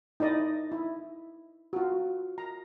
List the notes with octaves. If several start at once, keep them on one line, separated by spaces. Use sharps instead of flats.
D#4 E4 D5 D#5
E4
F4 F#4
A#5